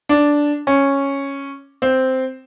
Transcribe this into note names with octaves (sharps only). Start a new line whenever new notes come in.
D4
C#4
C4